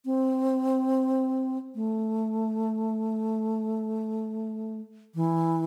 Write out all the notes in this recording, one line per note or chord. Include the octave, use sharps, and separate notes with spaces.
C4
A3
E3